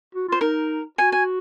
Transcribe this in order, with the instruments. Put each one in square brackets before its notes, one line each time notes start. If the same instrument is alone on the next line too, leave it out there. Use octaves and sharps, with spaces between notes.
[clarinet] F#4
[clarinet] F4 [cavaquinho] C5
[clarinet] D#4 [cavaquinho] A#4
[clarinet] F#4 [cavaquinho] G#5
[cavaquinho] G#5